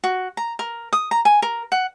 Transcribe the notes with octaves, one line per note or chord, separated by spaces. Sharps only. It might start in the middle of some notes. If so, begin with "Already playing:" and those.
F#4
A#5
A#4
D#6
A#5
G#5
A#4
F#5